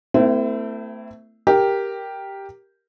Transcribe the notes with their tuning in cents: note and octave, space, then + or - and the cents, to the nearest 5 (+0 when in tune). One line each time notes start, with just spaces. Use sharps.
A3 +30 C4 -35 E4 +0
G4 +0 A#4 +0